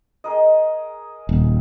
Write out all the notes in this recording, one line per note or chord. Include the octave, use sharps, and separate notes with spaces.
G#4 A#4 D#5
D#1